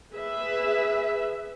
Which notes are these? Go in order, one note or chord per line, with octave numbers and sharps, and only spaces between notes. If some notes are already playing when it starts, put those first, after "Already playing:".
G#4 B4 E5